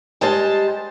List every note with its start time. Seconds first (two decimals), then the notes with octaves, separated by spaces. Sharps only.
0.21 G3 G#3 C5 A5